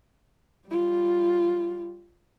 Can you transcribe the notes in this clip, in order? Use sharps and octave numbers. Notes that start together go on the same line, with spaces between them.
G3 F4